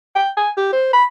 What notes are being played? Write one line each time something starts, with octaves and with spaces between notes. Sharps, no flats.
G5
G#5
G4
C5
B5